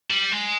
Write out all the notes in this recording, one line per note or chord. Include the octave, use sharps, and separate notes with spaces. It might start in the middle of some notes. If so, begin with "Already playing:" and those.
G3
G#3